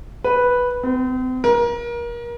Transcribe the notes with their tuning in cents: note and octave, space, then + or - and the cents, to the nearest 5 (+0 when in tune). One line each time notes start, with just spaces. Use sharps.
B4 -5
C4 -40
A#4 +30